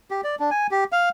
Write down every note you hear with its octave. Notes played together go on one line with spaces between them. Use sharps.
G4
D5
D4
G#5
G4
F5